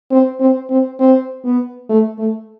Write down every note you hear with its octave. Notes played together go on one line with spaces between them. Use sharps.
C4
C4
C4
C4
B3
A3
A3